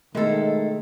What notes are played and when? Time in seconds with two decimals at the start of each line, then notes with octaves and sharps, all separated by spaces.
0.15 B2 D#3 G#3 A3 E4 A4